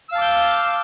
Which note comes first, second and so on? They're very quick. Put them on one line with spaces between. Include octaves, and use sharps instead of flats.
E6 F5 A5 D6 G6